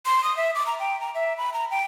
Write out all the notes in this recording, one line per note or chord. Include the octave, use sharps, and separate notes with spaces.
C6
D#6
E5
D6
A#5
G5
A#5
E5
B5
A#5
G5